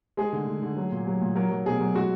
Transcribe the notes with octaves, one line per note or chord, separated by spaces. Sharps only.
G#3 G#4
D3
D3
D3
F#3
A#2
F#3
A#2
F#3 A#4
F#3
B2 G#4
F#3
G#3 F#4